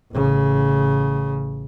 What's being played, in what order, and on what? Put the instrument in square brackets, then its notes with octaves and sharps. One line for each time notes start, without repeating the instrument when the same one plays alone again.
[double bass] A1 C#3